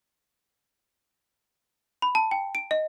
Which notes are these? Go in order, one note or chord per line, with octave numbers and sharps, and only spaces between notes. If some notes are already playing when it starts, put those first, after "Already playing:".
B5
A5
G5
D7
D#5